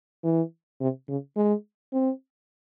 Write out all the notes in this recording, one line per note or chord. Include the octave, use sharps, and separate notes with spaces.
E3
C3
C#3
G#3
C4